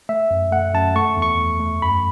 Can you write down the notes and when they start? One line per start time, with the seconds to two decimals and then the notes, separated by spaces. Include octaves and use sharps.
0.09 A3 E5
0.31 F#2
0.52 A3 F#5
0.74 F#2 A5
0.96 A3 C#6
1.17 E2
1.22 C#6
1.39 E2
1.60 A3
1.82 F#2 B5